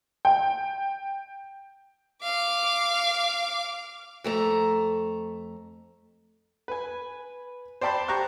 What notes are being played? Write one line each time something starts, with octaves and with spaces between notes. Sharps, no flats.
G5
F5 D6
F2 A3 A#5
B4 G#5
C5 D5 G5 A5 B5 C6
G4 A#5 C#6 F#6